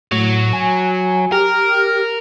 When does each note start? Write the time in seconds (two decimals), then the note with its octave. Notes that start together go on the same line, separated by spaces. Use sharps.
0.12 A2 F#3
0.53 G#5
1.32 G4 A#4 F6